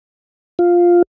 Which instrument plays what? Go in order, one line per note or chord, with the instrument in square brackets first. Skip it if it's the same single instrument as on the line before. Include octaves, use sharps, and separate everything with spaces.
[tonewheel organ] F4